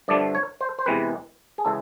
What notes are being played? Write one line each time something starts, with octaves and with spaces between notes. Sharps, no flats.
G2 D3 F3 A3 D5
C#5
C5
C5
E2 C3 E3 G#3 C4 B4
G#4
C#3 E3 G#3 A4